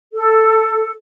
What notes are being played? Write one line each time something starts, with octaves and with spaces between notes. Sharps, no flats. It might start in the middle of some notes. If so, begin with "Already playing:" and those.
A4